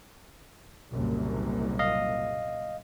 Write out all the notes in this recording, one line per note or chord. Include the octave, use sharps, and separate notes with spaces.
F#1 C2 A#2
D#5 F5